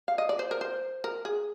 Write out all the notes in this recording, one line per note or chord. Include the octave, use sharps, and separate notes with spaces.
F5
D#5
D5
C5
A#4
C5
A#4
G#4